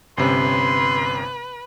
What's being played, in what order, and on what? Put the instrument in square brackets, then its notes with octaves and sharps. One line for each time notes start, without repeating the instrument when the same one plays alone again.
[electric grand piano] G1 C3 C#4 [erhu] B4 [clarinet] C6